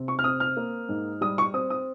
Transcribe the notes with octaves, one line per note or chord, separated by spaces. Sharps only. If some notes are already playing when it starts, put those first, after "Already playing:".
Already playing: C3
C#6
F6
C4 D#6
F6
A#3
G#2
G3 D#6
C#6
C4 D#6
D#6